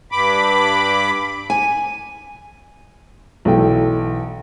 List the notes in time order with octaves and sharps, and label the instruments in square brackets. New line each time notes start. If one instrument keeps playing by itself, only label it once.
[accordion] G2 B5 D6
[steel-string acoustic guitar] G#5
[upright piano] B1 E3 A4 G5